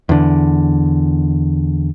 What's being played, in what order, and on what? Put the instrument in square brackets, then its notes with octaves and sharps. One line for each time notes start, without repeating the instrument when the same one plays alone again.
[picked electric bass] E2 D3